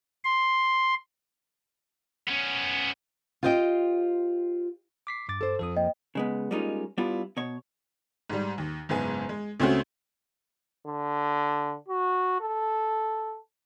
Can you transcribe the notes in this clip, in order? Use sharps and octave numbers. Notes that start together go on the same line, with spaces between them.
C6
B3 C#4
F4 G4 C5 D#5 E5 G5
D6 B6 C7
G2 D6 A6
A4 C5
F2 F3 A4 D#6
A#3 D#5 G5
C#3 G#3 B3
G3 G#3 A#3 C#4 D#4 F4
G3 B3 D4 E4 F4
B2 C#5
G#2 G3
D#2
F#1 G#2 G#3 B3 G#5
G#3
C#2 A3 C4 C#4 F#4
D3
F#4
A4